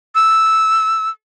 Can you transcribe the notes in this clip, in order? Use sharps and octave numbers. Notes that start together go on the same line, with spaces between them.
E6